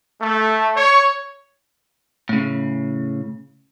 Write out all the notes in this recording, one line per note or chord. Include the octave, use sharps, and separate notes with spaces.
A3
C#5
A2 C#3